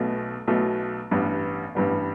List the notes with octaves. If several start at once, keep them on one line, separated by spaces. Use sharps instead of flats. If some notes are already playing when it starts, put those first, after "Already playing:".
Already playing: B1 B2 A3
B1 B2 A3
A1 G2 G3 B3
A1 G2 G3 B3